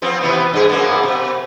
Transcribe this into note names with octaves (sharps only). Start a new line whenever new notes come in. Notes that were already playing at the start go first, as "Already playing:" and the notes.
F3 B3 C4
B2 E3 B3
G2 G#4
F#2 A#3 B3
B2